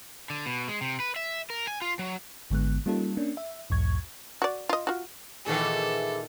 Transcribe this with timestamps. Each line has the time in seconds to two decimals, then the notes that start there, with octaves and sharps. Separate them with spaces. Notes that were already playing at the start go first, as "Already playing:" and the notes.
0.30 D3
0.46 B2
0.68 G#3
0.81 C3
1.00 B4
1.16 E5
1.50 A#4
1.67 G#5
1.82 F4
1.99 F#3
2.50 G#1 D3 G#3 B3 F#6
2.86 G3 A#3 C#4 D#4 F4 A4
3.17 A#3 C#4 D4
3.37 E5
3.70 B1 E2 G#2 C#6 G#6
4.42 F#4 D5
4.69 F4 D#5
4.87 F4 F#4
5.46 A#2 D#3 E3 F#4 G#4 A4